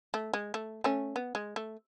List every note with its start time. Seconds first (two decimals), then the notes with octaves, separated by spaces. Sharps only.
0.14 A3
0.34 G#3
0.54 A3
0.84 A3 C#4
1.16 B3
1.35 G#3
1.56 A3